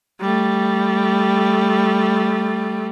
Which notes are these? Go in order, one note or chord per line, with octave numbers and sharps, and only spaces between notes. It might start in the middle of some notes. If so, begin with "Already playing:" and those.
G3 A3